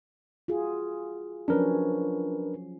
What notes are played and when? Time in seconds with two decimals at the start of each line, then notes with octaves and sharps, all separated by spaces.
0.48 F4 F#4 G#4
1.48 F3 F#3 C#4 D4 A#4 B4